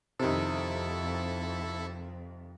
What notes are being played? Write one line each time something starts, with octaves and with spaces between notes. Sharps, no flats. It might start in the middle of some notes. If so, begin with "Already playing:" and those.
F2 C3 D#3 E4 A4